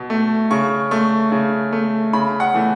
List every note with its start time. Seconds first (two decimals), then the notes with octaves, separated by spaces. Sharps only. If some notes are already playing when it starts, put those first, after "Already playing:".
Already playing: B2
0.10 A3
0.51 C#3 C#6
0.91 A3 C#6
1.32 C#3
1.73 A3
2.13 C#3 B5
2.40 F#5
2.54 E3 A3